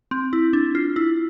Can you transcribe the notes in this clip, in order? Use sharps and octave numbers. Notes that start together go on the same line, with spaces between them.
C4
E4
D4
F4
E4